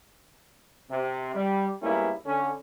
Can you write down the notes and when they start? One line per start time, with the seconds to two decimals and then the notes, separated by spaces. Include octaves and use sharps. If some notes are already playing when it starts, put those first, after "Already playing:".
0.90 C3
1.34 G3
1.82 G#2 G3 A#3 B3 C#4 E4
2.26 D3 C#4